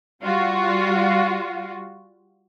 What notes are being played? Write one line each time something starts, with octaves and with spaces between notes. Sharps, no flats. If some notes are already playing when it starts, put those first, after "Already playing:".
G3 F4 F#4